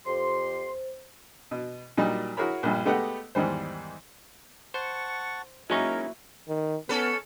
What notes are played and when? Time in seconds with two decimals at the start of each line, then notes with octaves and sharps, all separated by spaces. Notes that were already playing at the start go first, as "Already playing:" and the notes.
0.06 F2 G4 C5 C6
1.51 B2
1.98 A#2 F#3 G3 D#4
2.37 E4 F#4 G#4 A#4 C#5 B5
2.63 A#1 G2 A#2 G3
2.85 G#3 A3 B3 G4 D#5 F#5
3.35 E2 G#2 D#3 G3 C5
4.74 C5 F#5 A5 C#6
5.70 F#3 G#3 A#3 C#4 D#4 E4 A#4 C#6
6.49 D#3
6.89 B3 C#4 A4 B4